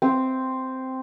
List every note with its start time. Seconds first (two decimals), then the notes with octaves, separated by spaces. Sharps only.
0.02 C4